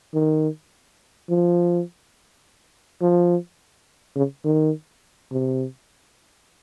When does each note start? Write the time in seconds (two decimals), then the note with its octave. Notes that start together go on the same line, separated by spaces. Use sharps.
0.14 D#3
1.29 F3
3.01 F3
4.15 C#3
4.44 D#3
5.31 C3